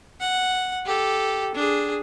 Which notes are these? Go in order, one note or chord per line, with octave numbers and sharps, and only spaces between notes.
F#5
G4 A4
D4 G#4